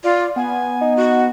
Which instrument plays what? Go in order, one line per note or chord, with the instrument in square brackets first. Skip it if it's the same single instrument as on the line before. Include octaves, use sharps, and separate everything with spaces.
[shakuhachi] F4 [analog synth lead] D5
[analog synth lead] B3 [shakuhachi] G#5
[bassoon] D#4
[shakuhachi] F#4